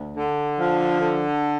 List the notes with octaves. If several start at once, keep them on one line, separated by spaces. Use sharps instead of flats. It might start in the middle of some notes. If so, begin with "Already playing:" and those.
Already playing: D2
D3
F3
D3